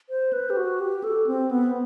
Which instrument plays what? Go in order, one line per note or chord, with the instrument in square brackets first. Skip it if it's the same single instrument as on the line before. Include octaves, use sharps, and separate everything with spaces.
[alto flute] C5
B4
G4
F#4
G4
A4
C4
B3